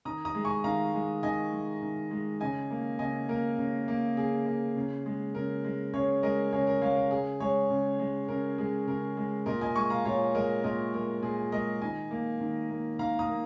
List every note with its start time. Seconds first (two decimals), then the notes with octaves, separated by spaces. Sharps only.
0.05 D#3 A#5 D#6
0.25 A#5 D#6
0.35 G#3
0.45 G#5 C#6
0.64 D#3 F5 A#5
0.94 G#3
1.23 D#3 D#5 G#5
1.53 G#3
1.82 D#3
2.11 G#3
2.40 C#3 D#5 G#5
2.70 A#3
2.99 C#3 D#5 G#5
3.29 A#3 A#4
3.58 C#3
3.88 A#3
4.17 C#3 G#4
4.46 A#3
4.76 C#3
5.06 G#3
5.35 C#3 A#4
5.64 G#3
5.93 C#3 G#4 C#5
6.23 G#3 A#4 D#5
6.52 C#3 G#4 C#5
6.67 A#4
6.82 G#3 C#5 F5
6.96 A#4
7.11 C#3 G#4
7.40 G#3 G#4 C#5
7.70 C#3
7.99 G#3
8.28 C#3 A#4
8.58 G#3 G#4
8.87 C#3 A#4
9.17 G#3
9.46 A#2 A#4 D#5
9.61 D#5 G#5
9.75 G#3 G#5 C#6
9.90 F5 A#5
10.05 A#2 C#5 F5
10.34 G#3 A#4 D#5
10.64 A#2 A#4 D#5
10.94 G#3 A#4
11.23 A#2 G#4
11.52 G#3 A#4 D#5
11.82 D#3 D#5 G#5
12.11 A#3
12.40 D#3
12.70 A#3
12.99 D#3 F5 A#5
13.19 A#5 D#6
13.28 A#3